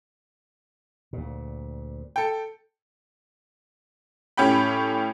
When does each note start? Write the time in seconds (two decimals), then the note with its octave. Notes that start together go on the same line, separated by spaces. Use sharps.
1.13 D2 A#2
2.16 A4 G5
4.37 A2 C#4 G4 G5 B5